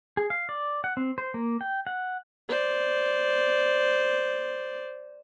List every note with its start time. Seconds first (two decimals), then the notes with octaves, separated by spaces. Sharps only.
0.17 G#4
0.30 F5
0.49 D5
0.84 F#5
0.97 C4
1.18 C5
1.34 A#3
1.61 G5
1.87 F#5
2.49 C5 D5